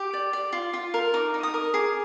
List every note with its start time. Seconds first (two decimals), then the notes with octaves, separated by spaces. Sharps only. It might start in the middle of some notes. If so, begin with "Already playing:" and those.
Already playing: G4 D6
0.13 D5
0.33 D5
0.53 F4
0.73 F4
0.94 A#4
1.14 D#4 D6
1.34 D#4
1.43 D#6
1.54 A#4
1.74 G#4 D6